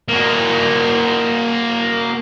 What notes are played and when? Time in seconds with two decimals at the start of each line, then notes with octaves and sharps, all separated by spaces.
0.08 A#3 F#4